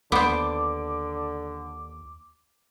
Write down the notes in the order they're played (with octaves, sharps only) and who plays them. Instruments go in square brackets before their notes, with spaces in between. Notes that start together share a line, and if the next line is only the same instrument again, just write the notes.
[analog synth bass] D#2 [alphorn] D3 [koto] B3 C5 [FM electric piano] D6